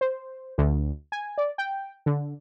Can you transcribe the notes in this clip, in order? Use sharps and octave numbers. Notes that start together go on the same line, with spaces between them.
C5
D2
G#5
D5
G5
D3